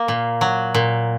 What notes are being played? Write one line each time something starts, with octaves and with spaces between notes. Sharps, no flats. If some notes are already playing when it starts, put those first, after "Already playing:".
Already playing: A#3
A#2
F#3
A#2